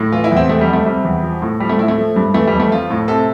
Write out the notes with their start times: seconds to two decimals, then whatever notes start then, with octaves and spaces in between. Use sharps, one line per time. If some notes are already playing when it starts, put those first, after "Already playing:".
Already playing: A2
0.12 E3 F4
0.24 E4
0.31 E2
0.37 C4
0.49 C3 A3
0.61 G3
0.67 F2
0.73 A3
0.86 C3 G3
1.04 E2
1.23 F3
1.42 A2
1.60 F3 G3
1.69 A3
1.78 A2 E4
1.88 A3
1.98 F3
2.16 G2
2.34 E3 A3
2.47 G3
2.52 F2
2.60 A3
2.71 F3 F4
2.90 A2
3.08 C3 A4